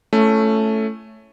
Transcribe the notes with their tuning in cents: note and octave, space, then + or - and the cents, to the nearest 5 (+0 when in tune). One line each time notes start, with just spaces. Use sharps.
A3 +0 C#4 +0 E4 +30